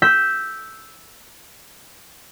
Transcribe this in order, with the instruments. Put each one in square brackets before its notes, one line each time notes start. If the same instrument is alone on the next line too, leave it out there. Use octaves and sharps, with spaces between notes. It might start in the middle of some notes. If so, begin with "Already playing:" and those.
[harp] E6 G6 B6